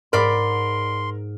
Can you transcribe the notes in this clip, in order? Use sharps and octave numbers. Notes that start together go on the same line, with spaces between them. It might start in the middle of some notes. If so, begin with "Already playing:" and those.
G#2 A#4 D5 B5 C6 D6